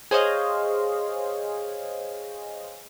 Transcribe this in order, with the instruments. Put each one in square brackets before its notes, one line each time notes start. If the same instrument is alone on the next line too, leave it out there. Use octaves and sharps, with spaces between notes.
[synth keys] G#4 C5 C#5 D#5 F5